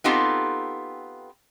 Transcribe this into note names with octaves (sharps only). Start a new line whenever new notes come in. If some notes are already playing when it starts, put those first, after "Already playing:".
B3 C4 D#4 F4 G4 A4